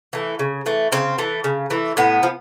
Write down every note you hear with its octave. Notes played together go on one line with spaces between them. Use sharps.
E3 A3
C#3
E3 A3
C#3 C4
E3 A3
C#3
E3 A3
A2 B3
F3